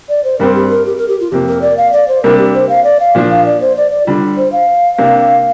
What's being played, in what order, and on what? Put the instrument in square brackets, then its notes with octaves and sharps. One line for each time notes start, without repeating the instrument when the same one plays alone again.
[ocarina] D5
C5
[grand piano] G2 G3 C4 [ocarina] A#4
[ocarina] G4
A#4
G4
A#4
G4
F4
[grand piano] F2 C3 A#3 [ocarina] G4
[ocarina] A#4
D5
F5
D5
C5
[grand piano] C3 G3 A#3 D4 [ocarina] A#4
[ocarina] G4
C5
F5
D5
F5
[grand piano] A#2 F3 D4
[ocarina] F5
D5
C5
D5
D5
[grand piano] D3 G3 D4 [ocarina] F4
[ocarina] C5
F5
[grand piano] C3 A#3 D4